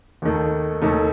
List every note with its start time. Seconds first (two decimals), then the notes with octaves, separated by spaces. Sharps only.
0.22 D#2 D#3 A3
0.82 D#2 D#3 A3